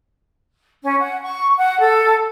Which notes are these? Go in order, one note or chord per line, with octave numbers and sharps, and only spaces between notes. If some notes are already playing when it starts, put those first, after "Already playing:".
C#4
F#5
C#6
F#5
A4